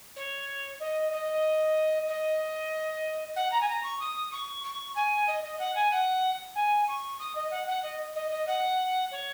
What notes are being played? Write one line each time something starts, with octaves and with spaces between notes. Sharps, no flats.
C#5
D#5
D#5
D#5
F#5
A#5
G#5
A#5
C#6
D#6
C#6
C#6
G#5
D#5
D#5
F#5
G#5
F#5
G#5
C#6
D#6
D#5
F#5
F#5
D#5
D#5
D#5
F#5
C#5